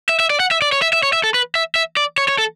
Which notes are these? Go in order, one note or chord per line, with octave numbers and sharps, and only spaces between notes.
E5
E5
D5
F#5
E5
D5
C#5
E5
E5
C#5
E5
A4
B4
E5
E5
D5
C#5
C#5
A4